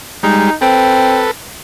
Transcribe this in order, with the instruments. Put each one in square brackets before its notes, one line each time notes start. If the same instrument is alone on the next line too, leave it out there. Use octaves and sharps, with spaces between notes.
[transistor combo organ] G3 G#3 [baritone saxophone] D#4
[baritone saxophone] C4 [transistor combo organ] A4 B4